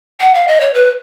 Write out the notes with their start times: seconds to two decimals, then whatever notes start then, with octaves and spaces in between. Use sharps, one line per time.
0.21 F#5
0.34 F5
0.47 D#5
0.60 C#5
0.74 B4